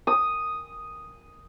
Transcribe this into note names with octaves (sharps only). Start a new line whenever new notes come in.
D#6